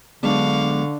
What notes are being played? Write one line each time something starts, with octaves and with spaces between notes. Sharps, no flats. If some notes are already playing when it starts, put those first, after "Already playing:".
D3 F#3 G#3 B3 D4 F5 C#6